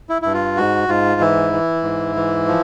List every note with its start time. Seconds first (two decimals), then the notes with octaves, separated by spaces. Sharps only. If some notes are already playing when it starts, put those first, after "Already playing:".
0.09 E4
0.22 G2 E4
0.34 F4
0.57 G#2 F#4
0.88 G#2 F4
1.21 E3 E4
1.53 E3
1.83 G#2
2.16 E3
2.47 F3